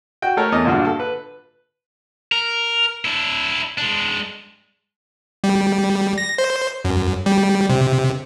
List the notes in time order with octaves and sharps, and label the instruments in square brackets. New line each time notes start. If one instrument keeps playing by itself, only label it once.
[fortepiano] F#4 G5
A3 A4 A#4 C#5
E2 D#5
G2 A#2 D3 F4 F#4
A4 A5
B4
[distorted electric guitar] A#4
D4 E4
G#3 D4
[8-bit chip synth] G3
A#6
C5
F#2
G3
C3